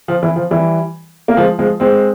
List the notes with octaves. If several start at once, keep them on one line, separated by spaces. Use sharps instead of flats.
F3
E3
F3
E3 G3
A#3
F3 G#3
F3 G#3
G#3 C4